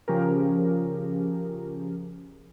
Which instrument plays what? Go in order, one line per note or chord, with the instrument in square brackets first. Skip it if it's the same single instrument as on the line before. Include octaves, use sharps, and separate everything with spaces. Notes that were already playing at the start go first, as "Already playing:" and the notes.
[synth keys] C#3 F3 C#4 G4 G#4 A#4